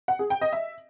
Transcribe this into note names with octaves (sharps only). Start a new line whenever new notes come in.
F#5
G#4
G5
D#5
E5